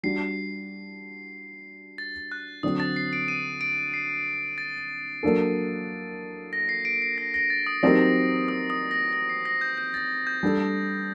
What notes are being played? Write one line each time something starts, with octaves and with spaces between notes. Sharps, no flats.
G3 D4 F#4 C7
A6
F#6
D3 F#3 C4 D#6
A6
C7
D7
D#7
D7
C7
A6
F#3 A#3 D4 A4
A#6
C7
D7
C7
A#6
A#6
A6
D#6
F#3 C4 D#4 G4 A#4 D#6
D#6
D#6
A#6
A#6
C7
A#6
G6
G6
A6
G6
G3 D4 A4